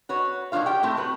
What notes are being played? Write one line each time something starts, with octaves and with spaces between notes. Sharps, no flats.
F#4 B4 C#5
A#2 D#3 F#3 D4 F4 F5
G4 G5
A2 A3 C4 G4
F#3 B4